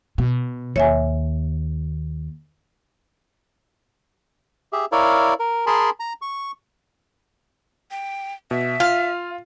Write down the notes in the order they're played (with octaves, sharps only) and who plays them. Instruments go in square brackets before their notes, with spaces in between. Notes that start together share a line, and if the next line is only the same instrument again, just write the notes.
[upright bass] B2
[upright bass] D#2 [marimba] C#5 E5 G#5
[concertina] G4 G#4 E5
E4 A#4 C#5 D5 F5
A#4
G#4 A#4 G#5 A5 B5 C6
A#5
C#6
[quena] G5
[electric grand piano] B2 [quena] E5
[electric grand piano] F4 [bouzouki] F5